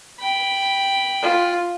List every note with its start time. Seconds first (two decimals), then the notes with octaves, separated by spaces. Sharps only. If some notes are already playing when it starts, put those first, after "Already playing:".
0.20 G5 B5
1.22 F4